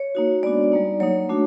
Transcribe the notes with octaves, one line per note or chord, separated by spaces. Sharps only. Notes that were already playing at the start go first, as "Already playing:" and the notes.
Already playing: C#5
A#3 D#4 F#4
G#3 B3 D4 F#4 D5
G3 A#3 D#4
F#3 A#3 D#4 C#5
A3 D4 F#4